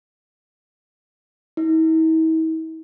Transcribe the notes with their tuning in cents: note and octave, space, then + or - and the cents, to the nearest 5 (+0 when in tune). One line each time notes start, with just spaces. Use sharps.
E4 -45